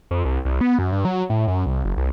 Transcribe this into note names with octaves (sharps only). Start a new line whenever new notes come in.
F2
C2
C2
B3
F#2
G2
F#3
A2
F#2
C2
F#1
C2